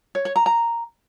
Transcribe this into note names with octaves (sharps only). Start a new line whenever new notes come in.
C#5
C#5
A#5
A#5